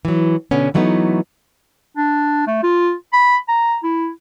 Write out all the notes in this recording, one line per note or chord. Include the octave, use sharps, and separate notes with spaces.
E3 F#3
B2 D3 B3 C#4
E3 F#3 G3 A3 B3 D#4
D4
A3
F4
B5
A#5
E4